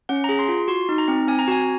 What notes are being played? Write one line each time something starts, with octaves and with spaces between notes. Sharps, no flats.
C#4 F#5
G#4 A#5
C6
F4
F#4 C6
D#4
A#5
C4
C4 G#5
A#5
F#4 G#5